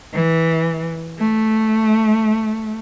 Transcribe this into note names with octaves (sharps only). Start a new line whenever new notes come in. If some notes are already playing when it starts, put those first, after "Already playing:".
E3
A3